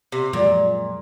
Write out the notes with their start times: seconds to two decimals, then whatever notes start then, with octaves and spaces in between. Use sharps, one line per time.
0.12 C3
0.33 F#2 A#2 F3 G#3